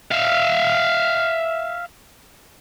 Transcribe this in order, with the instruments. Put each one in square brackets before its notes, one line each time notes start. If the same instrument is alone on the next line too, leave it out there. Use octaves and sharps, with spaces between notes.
[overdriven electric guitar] E5 F5